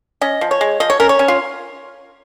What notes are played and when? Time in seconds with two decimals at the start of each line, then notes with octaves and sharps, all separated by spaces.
0.21 C#4 D#5
0.41 F3
0.51 C#5
0.61 G#3
0.80 F3 D#5
0.90 C#5
1.00 C#4 A#4
1.09 C#5
1.19 C#4
1.28 F4